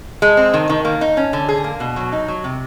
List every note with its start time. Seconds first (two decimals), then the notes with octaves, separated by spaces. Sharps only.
0.22 G#3
0.37 C4
0.54 D#3
0.69 D#3
0.85 A#3
1.01 D#4
1.17 C#4
1.33 D3
1.49 G#4
1.64 A#3
1.80 B2
1.96 F#3
2.12 D#4
2.28 F#3
2.44 C3